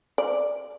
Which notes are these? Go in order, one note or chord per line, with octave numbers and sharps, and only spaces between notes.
D5